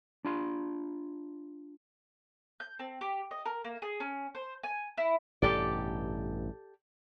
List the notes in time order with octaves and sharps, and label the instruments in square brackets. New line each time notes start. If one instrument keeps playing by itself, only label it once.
[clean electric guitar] D4 F4 C6
[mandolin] G6
C4
G4
D#5
A#4
A#3
G#4
C#4
C5
G#5
E4
[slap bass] A1 G2 B2 [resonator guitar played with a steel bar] G4 A4 D5